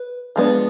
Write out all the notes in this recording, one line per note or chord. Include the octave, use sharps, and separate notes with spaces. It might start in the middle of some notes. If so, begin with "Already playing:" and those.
Already playing: B4
F3 G#3 B3 D4